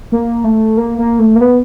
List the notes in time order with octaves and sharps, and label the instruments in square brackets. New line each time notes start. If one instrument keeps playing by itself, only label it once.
[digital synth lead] A#3
A3
A#3
A#3
A3
A#3
B3